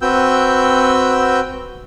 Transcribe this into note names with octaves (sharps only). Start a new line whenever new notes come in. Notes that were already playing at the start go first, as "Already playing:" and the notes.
C4 F#4 B4 G5 E6 G6